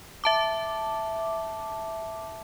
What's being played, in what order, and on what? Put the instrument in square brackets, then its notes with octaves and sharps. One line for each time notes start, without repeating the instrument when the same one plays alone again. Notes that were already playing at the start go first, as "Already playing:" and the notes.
[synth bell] E5 A5 D6